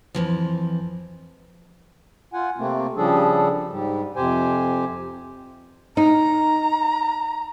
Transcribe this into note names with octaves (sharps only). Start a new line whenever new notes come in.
F2 E3 F3
F4 F#5 G#5
C3 A3 A#3 C4
C#3 F3 G3 D4 G#4 A4
G#2 G3
F2 C3 G4 C5 G#5
D#4 A#5